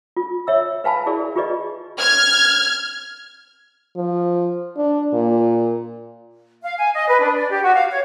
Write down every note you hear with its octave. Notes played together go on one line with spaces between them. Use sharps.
F4
C#5 E5 E6
B4 F5 G#5 A5 B5
E4 G#4 A#4 D5
F4 G4 G#4 B4 D5 D#5
F6 G#6
F3
D4
A#2
F5
G#5
D#5
B4
D4
D5
G4
F#4
F5
C#5